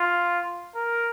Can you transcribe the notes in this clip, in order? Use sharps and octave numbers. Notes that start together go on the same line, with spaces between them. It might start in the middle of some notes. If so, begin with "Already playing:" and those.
Already playing: F4
A#4